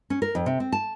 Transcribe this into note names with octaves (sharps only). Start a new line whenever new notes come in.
C#4
A#4
F2
C3
C4
A5